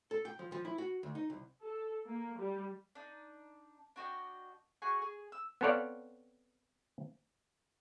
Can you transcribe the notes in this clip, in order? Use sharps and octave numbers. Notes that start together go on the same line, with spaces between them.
A4
G5
F3
F3
E4
F#4
D2
D#4
C2
A4
A#3
G3
D4 D#4
D4 F#4 D#5 G5
F#4 G#4 G#5 C#6
G#4
E6
B3 C4 A4 C#5 D5 F5